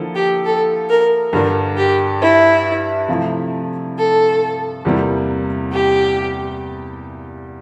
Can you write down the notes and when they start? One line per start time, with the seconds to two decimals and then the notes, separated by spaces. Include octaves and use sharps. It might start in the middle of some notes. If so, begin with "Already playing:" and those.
Already playing: D3 F3 A#3 E4 A4
0.15 G4
0.45 A4
0.89 A#4
1.33 G2 D3 G3 D4 A#4
1.77 G4
2.21 E4
3.08 C3 F3 A3 E4
3.97 A4
4.85 E2 C3 G3 A#3 E4
5.72 G4